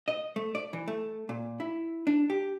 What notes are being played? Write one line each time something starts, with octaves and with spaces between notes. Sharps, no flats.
D#5
A3
D5
E3
A3
A#2
E4
D4
G4